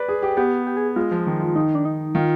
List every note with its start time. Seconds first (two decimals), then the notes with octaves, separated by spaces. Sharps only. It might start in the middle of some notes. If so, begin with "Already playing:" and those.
Already playing: B4 D5
0.08 G#4
0.22 G4
0.37 B3 G4
0.67 G4
0.77 G#4
0.96 G#3 F4
1.12 F3
1.27 D#3
1.41 F3
1.56 D#3 D#4
1.75 D4
1.85 D#4
2.15 D#3 F4